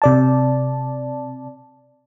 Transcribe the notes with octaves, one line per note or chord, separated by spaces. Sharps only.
C3 D5 A5